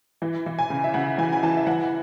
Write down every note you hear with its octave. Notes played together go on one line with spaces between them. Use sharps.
E3
E3
G#5
C#3
E5
C#3 F#5
E3 G#5
G#5
E3 A5
E5
E3 F#5